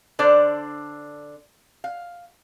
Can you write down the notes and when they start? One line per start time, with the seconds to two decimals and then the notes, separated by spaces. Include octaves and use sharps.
0.19 D3 D4 A4 C5 D5
1.84 F5